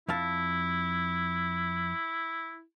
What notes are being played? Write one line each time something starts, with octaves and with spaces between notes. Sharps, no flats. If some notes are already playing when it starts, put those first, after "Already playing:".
F2 E4 F5 A5